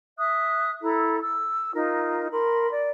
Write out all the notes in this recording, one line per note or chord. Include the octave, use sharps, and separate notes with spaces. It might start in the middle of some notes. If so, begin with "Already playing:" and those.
E5 D#6 F#6
E4 A4 A#5
E6
D#4 F4 A#4
A#4 B5 C6
D5